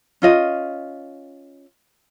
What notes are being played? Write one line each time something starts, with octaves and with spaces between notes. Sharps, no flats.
C#4 F4 D#5